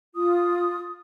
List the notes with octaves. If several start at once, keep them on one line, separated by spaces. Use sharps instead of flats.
F4 D#6